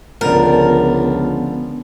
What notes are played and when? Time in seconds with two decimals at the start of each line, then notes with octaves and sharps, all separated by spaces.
0.21 C#2 D3 F3 B3 A#4